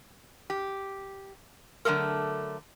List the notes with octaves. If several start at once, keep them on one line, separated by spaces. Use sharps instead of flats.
G4
D3 F#3 A3 A4 A#4